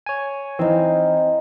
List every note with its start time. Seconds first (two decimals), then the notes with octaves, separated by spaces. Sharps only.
0.06 C#5 G#5
0.59 E3 C4 D#4 F5